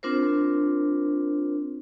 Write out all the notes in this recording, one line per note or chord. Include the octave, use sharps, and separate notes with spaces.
C4 D4 F4 A#4 C5